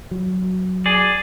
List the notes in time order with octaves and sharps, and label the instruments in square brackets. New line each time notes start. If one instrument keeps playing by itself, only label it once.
[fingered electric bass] F#3
[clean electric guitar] G#4 D5